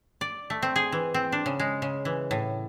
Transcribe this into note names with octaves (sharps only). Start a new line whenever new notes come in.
D5
A3
C4
G#4
E3
C4
D4
C#3
G#3
C#3
E3
A2